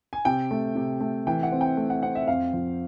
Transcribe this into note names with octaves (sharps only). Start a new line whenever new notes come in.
G#5
C3 G5
A3
C3
A3
E3 G5
F#5
C4
G5
A3
F#5
C4 F#5
E5
F2 F5
F3